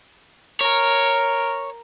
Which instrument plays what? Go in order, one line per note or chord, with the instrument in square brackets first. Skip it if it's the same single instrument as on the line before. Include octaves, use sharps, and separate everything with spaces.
[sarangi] A#4 [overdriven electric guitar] C#5